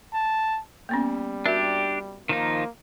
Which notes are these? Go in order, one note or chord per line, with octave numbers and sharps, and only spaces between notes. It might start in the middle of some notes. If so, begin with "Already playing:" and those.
A5
G3 A#3 B3 C#4
D4 F#4 G4 A#4 E5
D#3 F3 A#3 D#4